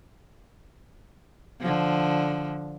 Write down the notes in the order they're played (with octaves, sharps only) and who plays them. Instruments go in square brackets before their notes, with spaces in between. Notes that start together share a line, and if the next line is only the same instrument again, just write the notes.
[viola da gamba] D3 F3